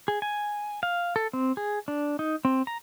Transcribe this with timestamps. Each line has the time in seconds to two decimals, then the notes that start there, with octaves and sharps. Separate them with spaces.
0.08 G#4
0.22 G#5
0.83 F5
1.16 A4
1.33 C4
1.57 G#4
1.88 D4
2.19 D#4
2.45 C4
2.67 A#5